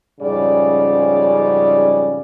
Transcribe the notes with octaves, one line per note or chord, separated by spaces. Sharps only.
F2 G#2 C#3 G3 C#4 D5